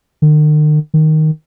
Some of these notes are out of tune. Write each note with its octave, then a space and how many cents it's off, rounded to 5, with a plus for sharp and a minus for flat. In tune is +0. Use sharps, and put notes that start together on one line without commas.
D#3 -45
D#3 +0